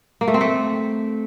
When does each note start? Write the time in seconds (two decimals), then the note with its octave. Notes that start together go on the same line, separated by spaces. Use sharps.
0.21 A#3
0.28 A3
0.34 C4
0.41 A3